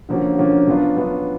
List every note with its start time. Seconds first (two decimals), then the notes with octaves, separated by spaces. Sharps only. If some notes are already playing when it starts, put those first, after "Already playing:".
0.09 D3 F3 A#3 C#4 F#4
0.38 D3 F3 A#3 C#4 F#4
0.67 F#3 B3 D4 F4
0.97 F#3 B3 D4 F4